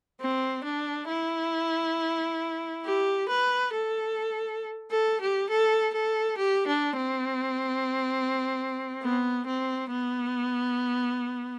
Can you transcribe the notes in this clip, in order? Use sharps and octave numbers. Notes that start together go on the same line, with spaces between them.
C4
D4
E4
G4
B4
A4
A4
G4
A4
A4
G4
D4
C4
B3
C4
B3